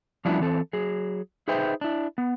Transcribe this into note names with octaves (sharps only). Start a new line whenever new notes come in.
F3 G3 C#4 D4 E4 F#4
E3 C4 A4
F#3 G#4
D#4 G#4 B4 C5 E5 G5
D4 E4
B3